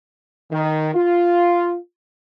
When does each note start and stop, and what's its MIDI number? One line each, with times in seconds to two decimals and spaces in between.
0.50 0.89 51
0.94 1.75 65